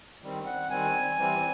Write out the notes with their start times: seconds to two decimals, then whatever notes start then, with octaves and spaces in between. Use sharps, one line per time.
0.22 D#3 G3 C4
0.46 F#5
0.70 D#3 G3 C4 G#5
1.18 E3 G3 C4